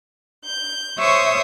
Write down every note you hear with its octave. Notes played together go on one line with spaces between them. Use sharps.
G6
C5 C#5 E5 C#6 D#6